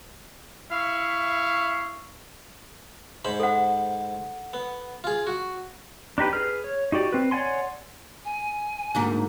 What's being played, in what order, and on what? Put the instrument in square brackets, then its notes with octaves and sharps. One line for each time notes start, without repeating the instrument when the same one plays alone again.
[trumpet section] E4 E5 F5 C#6
[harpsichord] G#2 C5 B5
[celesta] A4 F#5
[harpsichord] B3
F4 G#4
F#4
[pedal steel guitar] D4 D#4 G4 B4
G#4 B4 F6
C#5
D#4 F#4 G4 D5
C4 B4
C#5 D5 F#5 G#5 C6
[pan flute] G#5
[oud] D2 G#2 A#3